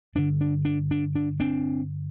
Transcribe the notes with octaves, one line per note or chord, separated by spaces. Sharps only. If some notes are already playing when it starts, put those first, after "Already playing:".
G2 D3 D4
D4
D4
D4
D4
C4 D4